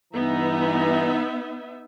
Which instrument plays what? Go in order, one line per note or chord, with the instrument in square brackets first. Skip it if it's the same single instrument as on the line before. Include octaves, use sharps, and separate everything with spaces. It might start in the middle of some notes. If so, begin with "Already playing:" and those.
[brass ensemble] G2 E3 A#5 [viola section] B3 D#4 E5